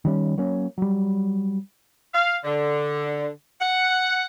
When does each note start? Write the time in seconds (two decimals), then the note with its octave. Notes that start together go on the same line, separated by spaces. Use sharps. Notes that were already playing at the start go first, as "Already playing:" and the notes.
0.05 D#3 G3 C#4
0.38 F#3 A#3 C#4
0.78 F#3 G3
2.14 F5
2.45 D3
3.61 F#5